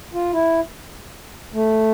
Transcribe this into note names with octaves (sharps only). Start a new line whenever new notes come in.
F4
E4
A3